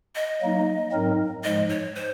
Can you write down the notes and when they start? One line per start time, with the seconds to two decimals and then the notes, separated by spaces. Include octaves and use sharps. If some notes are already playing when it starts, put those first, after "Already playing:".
0.15 D#5
0.41 F#3 A#3 D#4
0.92 G#2 F#3 C4 D#4 A#4
1.44 G#2 F3 G#3 D#5
1.69 C#5
1.95 C5